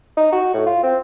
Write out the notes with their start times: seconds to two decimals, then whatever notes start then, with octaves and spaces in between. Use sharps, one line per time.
0.17 D#4
0.32 F#4
0.54 A2
0.66 F4
0.83 C4